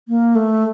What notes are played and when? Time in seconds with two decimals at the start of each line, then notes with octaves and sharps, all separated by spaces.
0.08 A#3
0.35 A3